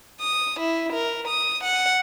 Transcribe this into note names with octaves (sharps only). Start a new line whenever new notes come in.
D#6
E4
A#4
D#6
F#5